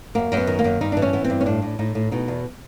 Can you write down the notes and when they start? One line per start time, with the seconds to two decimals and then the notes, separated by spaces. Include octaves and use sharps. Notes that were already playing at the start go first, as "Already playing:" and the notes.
0.15 F#2 A#3
0.32 F#2
0.37 B3
0.47 D#3
0.59 A#3
0.64 F#2
0.81 G2 D#4
0.92 E3 D4
1.02 C#4
1.13 E3 B3
1.24 C4
1.30 G2
1.41 C#4
1.46 A2 D4
1.62 A2
1.79 A2 D#4
1.95 A2
2.11 B2 D#4
2.28 E2